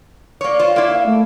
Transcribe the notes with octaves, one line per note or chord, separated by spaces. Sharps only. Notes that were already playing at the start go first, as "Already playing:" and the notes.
A#3 C#5 D5
F4 C5
A#3 E4
F5
A3